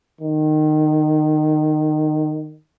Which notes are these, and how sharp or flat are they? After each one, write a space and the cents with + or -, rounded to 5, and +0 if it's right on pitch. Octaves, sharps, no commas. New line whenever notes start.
D#3 -20